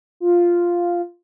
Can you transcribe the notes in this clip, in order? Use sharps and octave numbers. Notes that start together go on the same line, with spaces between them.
F4